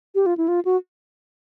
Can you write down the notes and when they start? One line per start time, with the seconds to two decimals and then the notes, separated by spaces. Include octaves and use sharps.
0.15 G4
0.26 F4
0.37 E4
0.48 F4
0.65 F#4